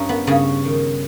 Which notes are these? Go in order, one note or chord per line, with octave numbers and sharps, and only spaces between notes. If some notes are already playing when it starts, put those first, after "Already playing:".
Already playing: G2 C#4 D#4
B3
G2 C#3 C#4
D#3